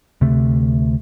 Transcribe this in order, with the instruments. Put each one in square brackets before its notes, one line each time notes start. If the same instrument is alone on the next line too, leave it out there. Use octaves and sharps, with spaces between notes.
[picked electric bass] D2 C3 A3